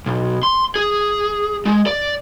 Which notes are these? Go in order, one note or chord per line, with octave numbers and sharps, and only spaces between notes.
B1
C6
G#4
G#3
D5